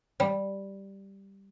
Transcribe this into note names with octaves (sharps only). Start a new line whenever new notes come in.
G3